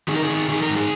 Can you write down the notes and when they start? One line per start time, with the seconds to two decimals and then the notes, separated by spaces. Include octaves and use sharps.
0.08 D#3 G#4
0.16 A#4
0.24 G#4
0.29 D#3
0.49 D#3 G#4
0.62 A#4
0.69 G#2
0.76 G#4